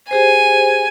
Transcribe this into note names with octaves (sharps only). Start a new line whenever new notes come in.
G4 G#4 C5 G#5